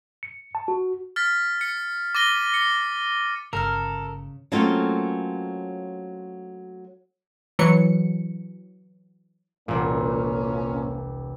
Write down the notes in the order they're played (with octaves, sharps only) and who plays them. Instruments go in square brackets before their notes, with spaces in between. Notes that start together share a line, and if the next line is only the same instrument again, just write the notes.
[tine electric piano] C#7
A5
F#4
[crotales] F6 A6 B6
C#7
D6 A6 A#6 D#7 G7
C#7
[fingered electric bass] G1 [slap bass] C#3 [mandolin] A4 F6 [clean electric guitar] A#4
[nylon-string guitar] F#3 A3 A#3 C4 C#4 F4
[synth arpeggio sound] E3 F#3 C#7
[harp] E1 C2 [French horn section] F2 A#3 C#4 [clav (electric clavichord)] A#2